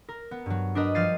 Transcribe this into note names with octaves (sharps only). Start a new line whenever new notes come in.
A#4
B3
G2 F#3
D4 A#4 B4 D#5
F3 G3 F6 A6 C7 D#7